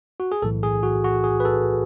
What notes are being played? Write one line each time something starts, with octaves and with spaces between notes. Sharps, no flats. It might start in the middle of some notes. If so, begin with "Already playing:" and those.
F#4
G#4
B1 A2 E3 A4
G#4
F#4
F#4
G#4
B4
A4